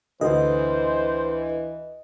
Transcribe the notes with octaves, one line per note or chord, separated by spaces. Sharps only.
D2 D3 E3 C5 D#5